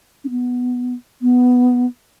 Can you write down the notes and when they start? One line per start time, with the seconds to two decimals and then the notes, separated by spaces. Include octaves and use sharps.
0.24 C#4
0.30 B3
1.22 B3